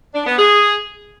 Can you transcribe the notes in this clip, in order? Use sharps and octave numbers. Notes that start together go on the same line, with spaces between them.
D4
B3
G#4